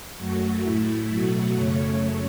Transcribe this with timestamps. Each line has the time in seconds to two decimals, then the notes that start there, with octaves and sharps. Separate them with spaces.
0.17 F#2 F#3 A3 F#4
0.62 A2 A3 E4
1.08 B2 F#3 A3 F#4
1.54 F#2 C#3 A3 C#5